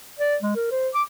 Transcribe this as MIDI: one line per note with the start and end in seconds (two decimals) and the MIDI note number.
0.19 0.36 74
0.42 0.54 56
0.56 0.70 70
0.71 0.89 72
0.94 1.02 86